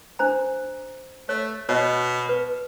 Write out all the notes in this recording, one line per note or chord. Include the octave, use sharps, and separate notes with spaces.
D4 C5 A#5
A3 C#5
B2 C#5 D#5
B4